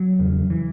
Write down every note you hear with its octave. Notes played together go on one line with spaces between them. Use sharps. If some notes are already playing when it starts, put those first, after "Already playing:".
Already playing: F#3
E2 C#3
E3